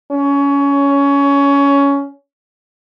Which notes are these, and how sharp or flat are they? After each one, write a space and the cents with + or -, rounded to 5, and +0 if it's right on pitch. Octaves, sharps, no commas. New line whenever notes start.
C#4 +20